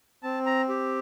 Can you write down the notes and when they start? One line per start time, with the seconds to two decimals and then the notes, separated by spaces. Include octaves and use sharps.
0.23 C4 A5
0.46 A#5
0.69 G4